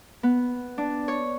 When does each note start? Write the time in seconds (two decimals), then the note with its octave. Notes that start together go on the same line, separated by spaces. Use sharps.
0.23 B3
0.78 D4
1.08 C#5